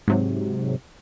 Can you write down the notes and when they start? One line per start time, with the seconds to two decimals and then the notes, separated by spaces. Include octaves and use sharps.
0.08 G#2 C3 F#3